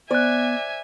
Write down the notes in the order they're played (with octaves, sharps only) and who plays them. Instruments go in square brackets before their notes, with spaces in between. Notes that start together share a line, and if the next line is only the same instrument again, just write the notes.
[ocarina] B3 [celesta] C5 F#6 [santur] D5 [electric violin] E5 G#5